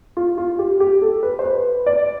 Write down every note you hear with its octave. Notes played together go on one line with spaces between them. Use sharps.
F4
F4
G4
G4
A4
B4
C5
B4
D5